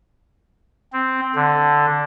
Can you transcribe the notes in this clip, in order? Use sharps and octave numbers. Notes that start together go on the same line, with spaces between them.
C4
D3